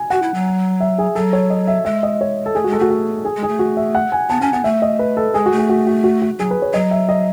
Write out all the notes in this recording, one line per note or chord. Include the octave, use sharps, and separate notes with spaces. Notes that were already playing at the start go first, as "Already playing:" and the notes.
Already playing: G#5
F#4 F#5
E4
F#3
E5
G#4
F#3 A4
C#5
D#5
E5
G#3 E5
D#5
C#5
A4
A3 G#4
G#3 F#4
A4
A3 F#4
F#4
G#4
G#3
G#4
A3
F#4
E5
F#5
G#5
B3 A5
C#4 G#5
B3 F#5
A3 E5
D#5
B4
A4
G#3 G#4
F#4
A3
G#4
F#4
F#4
F#4
F#4
F#3 G#4
B4
C#5
F#3 D#5
E5
D#5